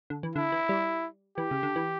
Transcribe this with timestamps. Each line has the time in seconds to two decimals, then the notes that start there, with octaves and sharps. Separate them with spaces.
0.10 D3
0.23 E3
0.35 D3 E4
0.52 E3
0.69 G3
1.38 E3 G4
1.51 C#3
1.63 D3
1.76 E3